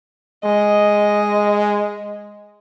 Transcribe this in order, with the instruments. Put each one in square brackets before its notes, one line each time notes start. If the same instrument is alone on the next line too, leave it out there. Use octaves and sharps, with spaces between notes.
[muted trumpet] G#3 [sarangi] D#5